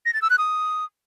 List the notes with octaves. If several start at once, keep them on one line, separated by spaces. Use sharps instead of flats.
A#6
A6
E6
F#6
D#6